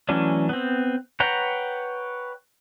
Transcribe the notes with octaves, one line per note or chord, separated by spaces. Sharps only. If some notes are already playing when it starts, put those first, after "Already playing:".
E3 F#3 A3 C#4 D4
B3 C4
B4 C#5 F#5 G5 A#5